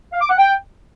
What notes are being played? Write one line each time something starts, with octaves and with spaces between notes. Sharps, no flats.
F5
D6
F#5
G5